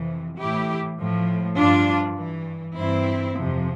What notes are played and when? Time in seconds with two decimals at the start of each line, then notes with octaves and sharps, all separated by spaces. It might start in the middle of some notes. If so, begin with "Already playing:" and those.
Already playing: F2 C3 E3
0.39 A2 E3 E4 G4
0.98 A2 F3
1.57 G2 F3 D4 F4
2.16 G2 E3
2.74 G2 E3 C4 E4
3.34 F2 C3 F3